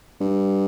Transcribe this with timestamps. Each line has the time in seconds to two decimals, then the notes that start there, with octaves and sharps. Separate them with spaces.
0.20 G2